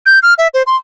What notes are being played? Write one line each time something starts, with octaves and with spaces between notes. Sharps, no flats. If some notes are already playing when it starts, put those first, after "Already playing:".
G6
F6
E5
C5
C6